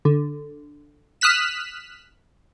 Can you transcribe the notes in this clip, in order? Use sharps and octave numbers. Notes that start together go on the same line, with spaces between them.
D3
D#6 F6 F#6 B6 E7